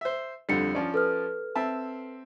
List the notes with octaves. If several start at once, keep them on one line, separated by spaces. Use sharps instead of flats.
C5 E5
F2 D3 G3 D4 C#7
F3 C#4 D5
A4 B4 F6
C4 E5 A5